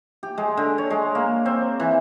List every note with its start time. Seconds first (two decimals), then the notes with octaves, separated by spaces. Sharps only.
0.23 G4
0.38 G#3
0.57 D3
0.78 C#5
0.90 G#3
1.15 A#3
1.46 C4
1.80 E3